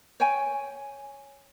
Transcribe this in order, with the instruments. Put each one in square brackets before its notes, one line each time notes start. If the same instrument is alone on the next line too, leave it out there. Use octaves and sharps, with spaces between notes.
[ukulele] C#5 G5 G#5